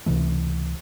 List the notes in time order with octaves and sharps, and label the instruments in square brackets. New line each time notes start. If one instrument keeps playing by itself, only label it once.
[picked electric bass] C#2 C3 E3 A3